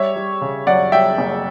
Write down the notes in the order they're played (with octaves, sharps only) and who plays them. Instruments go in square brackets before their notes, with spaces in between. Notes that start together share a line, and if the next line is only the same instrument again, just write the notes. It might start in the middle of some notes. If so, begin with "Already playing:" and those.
Already playing: [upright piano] G3 C#5 E5
G3
C#3
F#2 D5 F#5
G3 E5 G5
F#1